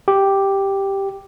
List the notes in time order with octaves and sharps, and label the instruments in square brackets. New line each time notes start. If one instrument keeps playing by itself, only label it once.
[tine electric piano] G4